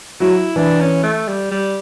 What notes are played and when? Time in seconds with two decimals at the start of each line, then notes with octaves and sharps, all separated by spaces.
0.20 F#3 E4
0.56 E3 D4
0.80 C#4
1.03 A3
1.28 G3
1.51 G3